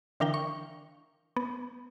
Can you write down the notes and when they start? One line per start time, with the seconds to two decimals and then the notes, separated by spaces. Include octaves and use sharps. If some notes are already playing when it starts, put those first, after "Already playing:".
0.20 D3 E3 D4 A#4 F5 G5
0.34 C#6
1.36 B3